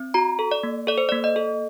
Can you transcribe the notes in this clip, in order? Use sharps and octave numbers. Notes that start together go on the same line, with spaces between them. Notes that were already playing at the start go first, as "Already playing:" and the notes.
Already playing: C4
F#4 A#5
A4
D5
A#3
A4 D5
C5
A#3 D5
D#5
A4